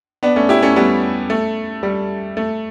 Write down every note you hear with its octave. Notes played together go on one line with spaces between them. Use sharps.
B3 D4
A3 C#4
E4 G4
A3 C#4
G3 B3
A3
G3
A3